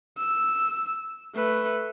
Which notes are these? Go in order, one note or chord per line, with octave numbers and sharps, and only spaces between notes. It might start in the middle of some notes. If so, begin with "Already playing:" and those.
E6
A3 B4